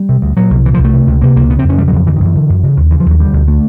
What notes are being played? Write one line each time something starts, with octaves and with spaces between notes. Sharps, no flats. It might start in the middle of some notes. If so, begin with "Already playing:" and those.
Already playing: G3
C3
D2
A#2 F#3
C2
A#2 E3
F3
C2
A3
C3
C#2
C3 A#3
C#2 A#3
C#3 B3
C4
F2
C#4
C#3 G3
F#3
F2 F3
D3 E3
D#3
F#2 E3
D3
F#2
C#3
D#2
C#3 E3
F3
D#2 F#3
D3 G3
D2
D3 A3